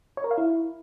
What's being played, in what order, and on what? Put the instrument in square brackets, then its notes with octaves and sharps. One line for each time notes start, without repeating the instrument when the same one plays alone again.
[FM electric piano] C#5
A#4
F5
E4